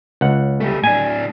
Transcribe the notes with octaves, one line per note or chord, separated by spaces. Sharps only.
C#2 F#5
G3 A3
A2 D4 G#5